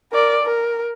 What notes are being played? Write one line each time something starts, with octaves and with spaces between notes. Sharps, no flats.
A#4 D5
A#4